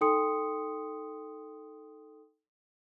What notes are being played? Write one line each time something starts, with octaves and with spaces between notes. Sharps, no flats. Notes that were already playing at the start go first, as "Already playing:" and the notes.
D#4 A4 G5 C6 D#6 C#7